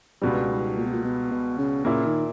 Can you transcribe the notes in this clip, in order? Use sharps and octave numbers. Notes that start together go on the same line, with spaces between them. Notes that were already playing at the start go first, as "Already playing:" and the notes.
C#2 G2 B2 G3
G#2
A#2
B2
A#2
B2
B2
C#3
A#2 C#3 A#3 E4
D#3